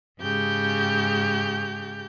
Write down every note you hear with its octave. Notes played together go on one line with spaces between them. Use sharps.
G#2 C#3 G4 G6